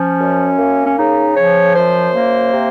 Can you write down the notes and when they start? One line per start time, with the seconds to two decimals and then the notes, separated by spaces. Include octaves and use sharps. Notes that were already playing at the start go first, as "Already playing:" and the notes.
Already playing: F3 C#4
0.19 F#2
0.58 A#3
0.86 C#4
0.98 C#3 D#4
1.35 F3 C#5
1.75 F#2 C5
2.13 A#3
2.52 C3